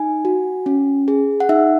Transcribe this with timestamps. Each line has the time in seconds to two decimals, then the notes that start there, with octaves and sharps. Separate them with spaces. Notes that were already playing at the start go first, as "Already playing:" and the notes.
Already playing: D#4 G#5
0.25 F#4
0.66 C#4
1.08 G#4
1.40 F#5
1.49 D#4 E5